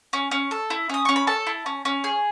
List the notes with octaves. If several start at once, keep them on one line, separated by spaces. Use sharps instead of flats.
C#4
C#4
A4
E4
C#4 D#6
C#4 C#6
B5
A4 A5
E4
C#4
C#4
G#4